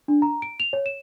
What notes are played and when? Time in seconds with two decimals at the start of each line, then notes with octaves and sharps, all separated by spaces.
0.08 D4
0.22 A#5
0.42 D7
0.60 F7
0.73 C#5
0.86 E7